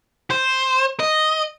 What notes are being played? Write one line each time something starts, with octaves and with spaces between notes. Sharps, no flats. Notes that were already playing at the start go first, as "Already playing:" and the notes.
C5
D#5